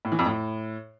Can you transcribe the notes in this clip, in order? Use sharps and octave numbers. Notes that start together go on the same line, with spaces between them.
A2
E3
F2
A2